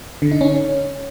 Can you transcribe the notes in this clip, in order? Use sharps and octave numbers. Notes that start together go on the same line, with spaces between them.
D3
D#4
C#4